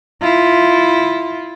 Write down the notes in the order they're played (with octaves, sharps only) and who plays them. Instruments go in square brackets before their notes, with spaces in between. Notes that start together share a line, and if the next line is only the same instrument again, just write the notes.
[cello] E4 F4